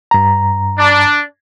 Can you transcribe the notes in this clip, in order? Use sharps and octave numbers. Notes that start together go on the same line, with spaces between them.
G2 A#5
D4